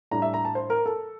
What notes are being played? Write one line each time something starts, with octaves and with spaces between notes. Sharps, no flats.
A2 G3 D4 A#5
E5
A#5
A5
C5
A#4
A4